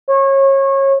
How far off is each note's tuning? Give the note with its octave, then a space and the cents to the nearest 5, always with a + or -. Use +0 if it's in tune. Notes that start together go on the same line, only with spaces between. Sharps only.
C#5 -25